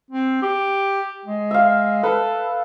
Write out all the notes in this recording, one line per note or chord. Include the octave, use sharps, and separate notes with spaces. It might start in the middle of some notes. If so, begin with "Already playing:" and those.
C4
G4
G#3
E5 F5
A4 B4 A5